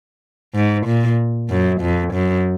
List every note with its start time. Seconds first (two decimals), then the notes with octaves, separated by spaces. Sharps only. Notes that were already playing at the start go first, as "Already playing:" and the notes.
0.55 G#2
0.86 A#2
1.50 F#2
1.81 F2
2.13 F#2